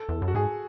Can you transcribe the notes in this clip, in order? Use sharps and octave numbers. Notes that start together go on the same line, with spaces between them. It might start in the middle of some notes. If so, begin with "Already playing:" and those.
Already playing: A4
E2
F#2
F#4
G#2 G#4